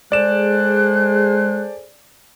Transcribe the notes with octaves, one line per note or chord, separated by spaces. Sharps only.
G#3 G#4 A4 C5 D5 F#6 E7